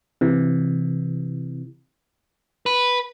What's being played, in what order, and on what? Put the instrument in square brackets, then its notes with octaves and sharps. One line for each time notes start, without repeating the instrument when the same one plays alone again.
[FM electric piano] C3 E3
[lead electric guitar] B4